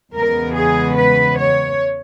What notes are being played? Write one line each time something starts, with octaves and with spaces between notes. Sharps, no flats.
E2 C#3 G#3 B3 A#4
G#4
B4
C#5